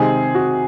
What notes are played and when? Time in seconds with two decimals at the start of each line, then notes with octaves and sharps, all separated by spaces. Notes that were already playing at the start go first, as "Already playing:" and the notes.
Already playing: C3 D#3 G#3 C4 G#4
0.35 F#4